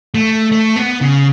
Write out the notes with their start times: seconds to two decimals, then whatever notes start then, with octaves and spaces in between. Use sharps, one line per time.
0.14 A3
0.52 A3
0.76 B3
1.01 C#3